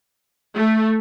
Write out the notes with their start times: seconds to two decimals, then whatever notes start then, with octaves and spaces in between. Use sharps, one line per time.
0.55 A3